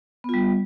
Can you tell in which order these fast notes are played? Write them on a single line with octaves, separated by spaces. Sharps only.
B3 F4 G3